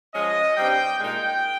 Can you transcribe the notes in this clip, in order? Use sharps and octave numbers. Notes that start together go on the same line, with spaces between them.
F3 G#3 C#4 D#5
G2 G3 C4 D#4 G5
A#2 G#3 D#4 G5